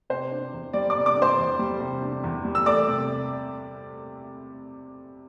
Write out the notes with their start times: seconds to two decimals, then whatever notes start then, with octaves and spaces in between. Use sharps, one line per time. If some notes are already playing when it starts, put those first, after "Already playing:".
0.10 C3 C5
0.32 D4
0.53 E2
0.73 G3 D5
0.90 D5 D6
0.96 C3
1.06 D5 D6
1.16 D4
1.22 C5 C6
1.38 E2
1.59 G3
1.80 C3
2.02 D4
2.24 E2
2.45 G3
2.55 E6
2.66 A3 D5 D6
2.88 C3